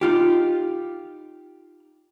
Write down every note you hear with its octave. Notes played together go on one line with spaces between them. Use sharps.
D#4 F4 G4